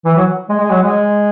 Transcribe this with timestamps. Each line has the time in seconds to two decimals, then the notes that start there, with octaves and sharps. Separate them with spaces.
0.05 E3
0.16 F#3
0.49 G#3
0.59 G#3
0.71 F#3
0.82 G#3